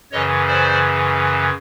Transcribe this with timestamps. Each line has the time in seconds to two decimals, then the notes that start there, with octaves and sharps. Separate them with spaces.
0.12 F#2 C#3 E3 C#5 D#5
0.47 C5 D5